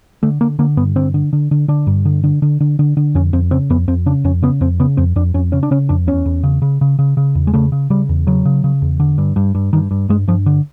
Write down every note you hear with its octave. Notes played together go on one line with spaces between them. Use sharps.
D3 A3
D3 A#3
D3 A#3
G2 B3
D3 C4
D3
D3
D3
D3 D4
G2
D3
D3
D3
D3
D3
D3
F2 C#4
F2 C4
C#3 C4
F2 B3
F2 C4
C#3 D4
F2 C#4
C#3 B3
F2 C4
C#3 B3
F2 C4
F2 D4
F2 C#4
C#3 C#4
D4
C#3 C#4
F2 D4
E2 C#4
E2
C#3
C#3
C#3
C#3
C#3
E2
G#3
C#3 A3
C#3
C#3 G3
E2
C#3 F#3
C#3
C#3
E2
D3
G2
G2
G2
G2 D#3
G2
G2 G#3
G2 F3
D3